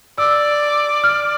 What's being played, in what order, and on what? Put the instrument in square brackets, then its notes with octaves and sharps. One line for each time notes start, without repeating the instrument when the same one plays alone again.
[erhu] D5 [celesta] E6
[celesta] F6